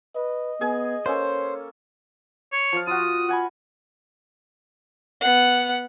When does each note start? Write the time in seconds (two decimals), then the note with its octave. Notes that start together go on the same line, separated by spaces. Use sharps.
0.16 B4 D#5
0.61 B3 G#4 G#5
1.06 A#3 C#4 A4 C5 C#5
2.52 C#5
2.73 F3 F5
2.87 F4 F#4 D#6
3.29 F#5 G#5 B5
5.21 B3 F#5